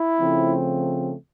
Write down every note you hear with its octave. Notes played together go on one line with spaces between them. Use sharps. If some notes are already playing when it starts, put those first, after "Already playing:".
Already playing: E4
C#3 F3 A3 C4